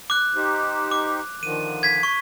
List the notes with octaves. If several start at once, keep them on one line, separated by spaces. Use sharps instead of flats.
D6 F#6
D#4 G4 C5
D6
D3 D#3 F3 D#7
G#6 B6
C#6